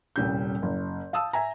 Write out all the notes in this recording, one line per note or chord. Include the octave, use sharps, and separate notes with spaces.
D#1 C2 G3 C#4 G6
F#1
F5 A5 D#6 E6
E5 G#5 A#5